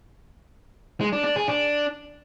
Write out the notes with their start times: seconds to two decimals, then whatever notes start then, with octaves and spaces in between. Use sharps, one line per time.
1.01 G#3
1.12 D4
1.24 D4
1.36 G#4
1.48 D4